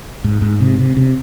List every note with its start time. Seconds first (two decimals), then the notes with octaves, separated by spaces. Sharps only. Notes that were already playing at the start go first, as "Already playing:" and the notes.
0.24 G#2
0.42 G#2
0.61 C3
0.79 C3
0.97 C3